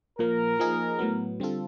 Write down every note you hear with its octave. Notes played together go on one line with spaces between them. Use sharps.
A#2 F3 A#3 A#4
F3 A#3 D#4 G#4
A2 F#3 B3
D3 G3 C4 F4 A4